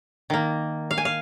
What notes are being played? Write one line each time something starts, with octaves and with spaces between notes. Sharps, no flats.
D#3 A#3
F5
G#5
F5